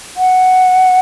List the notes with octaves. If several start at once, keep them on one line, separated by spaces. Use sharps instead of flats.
F#5